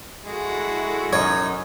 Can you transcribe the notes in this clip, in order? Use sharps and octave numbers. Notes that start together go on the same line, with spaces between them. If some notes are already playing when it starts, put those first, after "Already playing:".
G#3 E4 F#4 A4
F#2 D#4 C#5 D#5